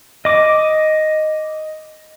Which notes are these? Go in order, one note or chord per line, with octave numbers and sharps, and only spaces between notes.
D#5 D6